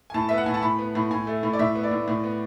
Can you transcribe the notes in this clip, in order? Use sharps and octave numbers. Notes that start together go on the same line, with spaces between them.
G#5
A2 A5
B3 E5
F#5
A2 G#5
A5
A2 B5
B3
A2
A2 G#5
A3
A2
D5
A2 E5
B3
D5
A2
A2
B3